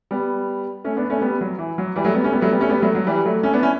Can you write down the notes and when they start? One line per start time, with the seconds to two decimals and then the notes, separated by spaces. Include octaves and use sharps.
0.11 G3 B3
0.84 A3 C#4
0.97 B3 D4
1.10 A3 C#4
1.21 G3 B3
1.41 F#3
1.59 E3
1.78 F#3
1.96 E3 G3
2.05 F#3 A3
2.14 G3 B3
2.24 A3 C#4
2.33 G3 B3
2.42 F#3 A3
2.51 G3 B3
2.61 A3 C#4
2.69 G3 B3
2.82 F#3 A3
2.95 F#3
3.07 E3 G3
3.25 F#3 A3
3.43 A3 C#4
3.53 B3 D4
3.62 C#4 E4